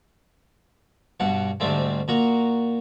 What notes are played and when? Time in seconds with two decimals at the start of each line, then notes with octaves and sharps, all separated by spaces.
1.20 G2 B2 F#5
1.60 D2 G#2 G3 A3 C4
2.08 A#2 F#4 A#5